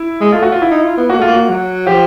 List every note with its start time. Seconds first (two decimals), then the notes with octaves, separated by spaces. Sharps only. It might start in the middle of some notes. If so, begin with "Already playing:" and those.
Already playing: E4
0.21 G#3
0.32 A3 F4
0.42 F#4
0.52 F4
0.62 E4
0.71 D#4
0.84 F4
0.97 B3
1.10 A#3 F#4
1.19 A3 F4
1.27 A#3
1.34 F#4
1.49 F#3
1.87 F3 G4